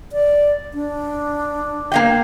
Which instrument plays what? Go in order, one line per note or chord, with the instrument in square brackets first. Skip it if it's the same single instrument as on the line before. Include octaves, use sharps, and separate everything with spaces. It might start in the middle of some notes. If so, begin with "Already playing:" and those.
[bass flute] D5
D4
[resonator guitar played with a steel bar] A#3 F5 G5